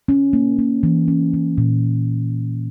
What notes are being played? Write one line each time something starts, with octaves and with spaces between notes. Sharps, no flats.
C#4
A#3
A#3
E3
C#4
E3
A#2